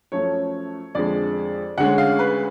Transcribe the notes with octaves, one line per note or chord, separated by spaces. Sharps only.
F#2 F3 A3 C#4 C#5
F2 D3 G#3 D5
D2 D3 G#3 C#4 F#5
F5
B4